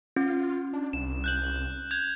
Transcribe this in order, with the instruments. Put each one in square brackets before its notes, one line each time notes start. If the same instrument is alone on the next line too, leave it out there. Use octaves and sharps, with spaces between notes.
[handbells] C#4 [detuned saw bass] F4
[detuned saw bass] D4
[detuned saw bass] C2 [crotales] E7
[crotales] F#6 G6 F#7
G6 G#6 F7